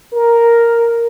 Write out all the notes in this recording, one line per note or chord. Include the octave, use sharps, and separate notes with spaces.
A#4